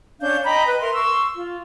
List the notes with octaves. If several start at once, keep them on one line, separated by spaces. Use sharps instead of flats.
C#4 D4 F5 G6
D#5 G5 A#5 B5
B4
A#4 E5 C6
C6 C#6 E6
F4